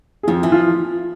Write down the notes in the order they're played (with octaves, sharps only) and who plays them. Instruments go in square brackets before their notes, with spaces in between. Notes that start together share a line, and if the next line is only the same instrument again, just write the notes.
[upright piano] G#4
[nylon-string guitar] F2 [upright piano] F3 F4
[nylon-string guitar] E3
[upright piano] F3 F4